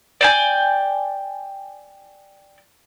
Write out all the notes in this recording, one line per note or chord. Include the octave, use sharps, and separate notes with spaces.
D5 G5 G#5